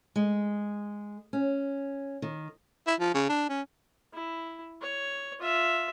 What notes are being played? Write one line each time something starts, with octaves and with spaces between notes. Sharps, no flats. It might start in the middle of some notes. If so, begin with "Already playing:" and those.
G#3
C#4
D#3
E4
F3
C#3
D4
C#4
E4
C#5
F4 E5